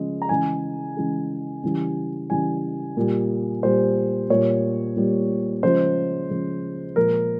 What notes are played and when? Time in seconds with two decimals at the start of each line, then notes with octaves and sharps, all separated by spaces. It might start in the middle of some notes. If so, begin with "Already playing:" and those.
Already playing: C#3 F3 G#3
0.22 A#5
0.29 C#3 E3 G#3 G#5
0.97 C#3 E3 G#3
1.64 C#3 E3 G3
2.30 C#3 E3 G3 G#5
2.97 A#2 G3
3.63 A#2 G3 C5
4.30 A#2 G3 C#5
4.96 A#2 G3
5.63 C#3 F3 G#3 C5
6.30 C#3 F3 G#3
6.96 A#2 F3 G#3 A#4